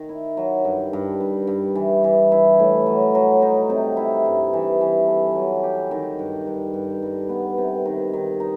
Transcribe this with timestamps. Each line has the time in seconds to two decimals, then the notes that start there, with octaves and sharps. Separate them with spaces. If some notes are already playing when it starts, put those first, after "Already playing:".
Already playing: D#3
0.09 E4
0.37 F#3
0.65 G2
0.93 G2
1.20 G2
1.47 G2
1.75 E3
2.04 E3
2.32 E4
2.59 A2
2.86 F#3
3.15 F#3
3.42 D#4
3.70 C3
3.97 E4
4.25 G2
4.53 E3
4.81 E3
5.08 A4
5.35 F#3
5.63 G4
5.91 D#3
6.19 G2
6.47 G2
6.74 G2
7.03 G2
7.29 B3
7.58 C3
7.85 D#3
8.13 D#3
8.40 D#4